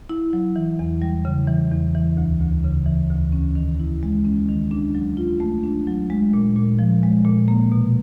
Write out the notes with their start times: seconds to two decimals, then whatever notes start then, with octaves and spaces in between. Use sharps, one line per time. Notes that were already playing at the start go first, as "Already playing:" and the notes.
0.09 E4
0.33 F#3
0.56 E3
0.79 E2
1.02 G3
1.25 C#3
1.48 E3
1.72 E2
1.95 E3
2.17 D2
2.41 D2
2.64 C#3
2.86 E3
3.10 D2
3.32 C#4
3.55 D#3
3.79 E4
4.03 G#3
4.25 C#4
4.49 D#3
4.71 D4
4.95 F#3
5.17 F4
5.40 A3
5.64 D4
5.87 F#3
6.10 G#3
6.34 A#2
6.56 A#2
6.79 F3
7.03 G#3
7.25 A#2
7.48 A#3
7.72 B2